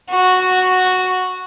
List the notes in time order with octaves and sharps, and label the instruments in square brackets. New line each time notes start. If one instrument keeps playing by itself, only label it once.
[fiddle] F#4